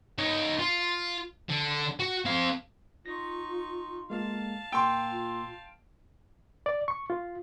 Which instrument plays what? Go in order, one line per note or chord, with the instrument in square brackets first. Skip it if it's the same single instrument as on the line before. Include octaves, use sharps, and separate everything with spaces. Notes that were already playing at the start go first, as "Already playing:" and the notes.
[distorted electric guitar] D#4 C#5
F4
D3
F#4
C4 F5
[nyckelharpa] D#4 C#6 [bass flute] F4 [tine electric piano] A#6
[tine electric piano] G#3 A#3 [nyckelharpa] F5 A5
[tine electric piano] A#2 A#3 E6 [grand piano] G5 C6
[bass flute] F4
[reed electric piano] D5
C#6
F4